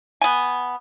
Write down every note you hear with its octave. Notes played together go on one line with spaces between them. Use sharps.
B3 G#5